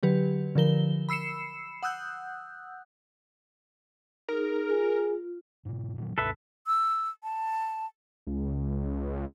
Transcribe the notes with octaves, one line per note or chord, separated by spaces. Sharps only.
D3 F#3 G4 B4
D3 F3 A#4 G7
B5 E6 C7 C#7 E7
F#5 D#6 E6 F#6 G6
D#4 G#4 A#4
F4 G#4
G#2 B2
A#2 D#3 F#3
C#2 G2 B2 A4 B4 E5
E6
A5
C#2